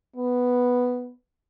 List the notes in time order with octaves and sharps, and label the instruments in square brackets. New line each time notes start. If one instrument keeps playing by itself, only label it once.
[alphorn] B3